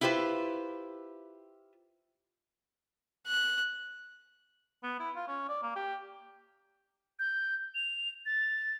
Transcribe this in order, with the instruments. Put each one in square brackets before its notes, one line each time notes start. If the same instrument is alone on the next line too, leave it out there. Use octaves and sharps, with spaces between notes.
[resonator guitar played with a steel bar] E4 F4 G4 B4 C5
[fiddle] F#6
[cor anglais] B3
E4
F4
C#4
D5
A#3
G4
[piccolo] G6
F7
A6